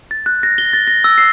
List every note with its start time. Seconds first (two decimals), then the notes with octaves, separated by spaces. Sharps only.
0.11 A6
0.26 F#6
0.43 A#6
0.58 G7
0.73 A6
0.87 A#6
1.04 E6
1.18 C7